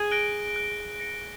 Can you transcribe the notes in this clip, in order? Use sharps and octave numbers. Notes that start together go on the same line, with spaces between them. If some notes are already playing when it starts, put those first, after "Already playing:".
Already playing: G#4
F#6 A#6 D7 G7
F#6
A#6 C#7